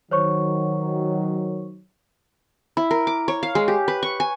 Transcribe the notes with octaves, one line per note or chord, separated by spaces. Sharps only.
D#3 F#3 C5 C#5 C#6
E4
A#4
D6
C#5
F5
G#3
G4
B4
C#6
G#5